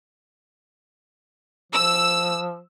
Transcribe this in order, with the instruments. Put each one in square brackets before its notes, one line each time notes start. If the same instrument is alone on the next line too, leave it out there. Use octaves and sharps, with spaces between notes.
[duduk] F3 [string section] E6